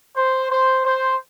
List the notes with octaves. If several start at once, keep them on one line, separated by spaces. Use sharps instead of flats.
C5
C5
C5